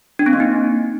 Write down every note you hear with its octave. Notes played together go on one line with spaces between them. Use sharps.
D4
C4
A#3
D#4